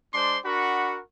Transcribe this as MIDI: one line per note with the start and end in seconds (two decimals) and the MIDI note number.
0.14 0.38 56
0.14 0.38 62
0.14 0.38 72
0.14 0.38 74
0.14 0.38 84
0.14 0.38 86
0.45 1.01 62
0.45 1.01 66
0.45 1.01 70
0.45 1.01 78
0.45 1.01 83
0.45 1.01 85